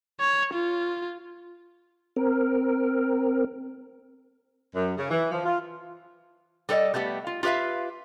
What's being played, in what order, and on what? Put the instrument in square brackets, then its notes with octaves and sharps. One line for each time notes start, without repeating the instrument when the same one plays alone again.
[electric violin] C#5
F4
[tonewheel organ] C4 A#4
[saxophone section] F#2
C#3
E3
F3
F4
[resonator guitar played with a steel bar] G3 A4 B4 D5 D#5
G3 A3 B3 G4
F4
F4 G4 B4 E5 F5